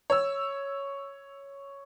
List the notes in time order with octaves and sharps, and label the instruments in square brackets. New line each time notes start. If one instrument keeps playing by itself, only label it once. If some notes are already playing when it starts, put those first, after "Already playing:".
[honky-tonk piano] C#5 E6